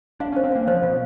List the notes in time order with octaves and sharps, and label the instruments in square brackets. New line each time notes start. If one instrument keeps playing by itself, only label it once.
[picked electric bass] D4 [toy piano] F5
[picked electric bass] C#4
[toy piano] C5
[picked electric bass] C4
[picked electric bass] A#3 [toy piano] F5
[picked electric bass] F3 [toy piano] C5
[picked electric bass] B2 [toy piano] F5